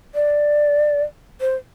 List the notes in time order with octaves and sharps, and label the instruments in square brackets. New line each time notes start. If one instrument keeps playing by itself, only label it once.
[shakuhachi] D5
C5